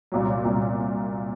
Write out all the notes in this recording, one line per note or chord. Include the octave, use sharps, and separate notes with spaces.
C2 A#2 F#3
C2 A#2 F#3